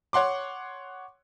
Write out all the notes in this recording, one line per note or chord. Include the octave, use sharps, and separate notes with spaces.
C#5 F#5 C6 D6